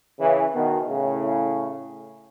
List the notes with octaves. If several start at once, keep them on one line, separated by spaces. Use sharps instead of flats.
C#3 E3
B2 D#3
A2 C#3